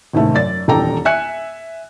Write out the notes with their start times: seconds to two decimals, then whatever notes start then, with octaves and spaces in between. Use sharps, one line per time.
0.13 A1 D#2 G#2 C3 A3
0.34 F#2 D5 A6
0.68 D#1 E2 D4 A4 G5 A#5
1.05 E5 G#5 F#6 C#7